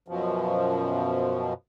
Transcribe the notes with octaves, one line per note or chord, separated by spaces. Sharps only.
F#2 B2 F3